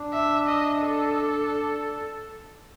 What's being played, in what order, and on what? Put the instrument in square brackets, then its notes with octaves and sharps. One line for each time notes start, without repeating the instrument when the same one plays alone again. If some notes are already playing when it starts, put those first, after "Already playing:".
Already playing: [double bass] D4
[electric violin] E5
D#5
A4